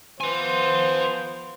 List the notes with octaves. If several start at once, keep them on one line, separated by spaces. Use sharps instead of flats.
F3 B3 B4 C5 G#5 C6